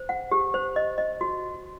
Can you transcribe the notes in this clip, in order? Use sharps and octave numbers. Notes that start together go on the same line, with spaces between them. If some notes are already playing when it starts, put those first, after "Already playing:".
Already playing: C5
F#5
G4
C5
D#5
D#5
F#4